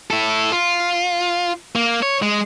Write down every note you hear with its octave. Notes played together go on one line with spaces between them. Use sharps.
E4 A4
F4
A#3
C#5
G#3